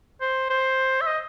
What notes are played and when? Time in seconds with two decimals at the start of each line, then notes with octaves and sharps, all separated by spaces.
0.21 C5
0.50 C5
1.01 E5
1.07 D#5